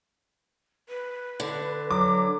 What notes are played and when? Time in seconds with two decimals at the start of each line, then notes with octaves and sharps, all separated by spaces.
0.89 B4
1.40 D3
1.91 F#3 D6